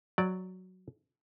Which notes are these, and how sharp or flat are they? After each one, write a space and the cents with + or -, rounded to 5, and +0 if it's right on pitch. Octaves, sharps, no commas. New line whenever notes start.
F#3 +0 D5 +0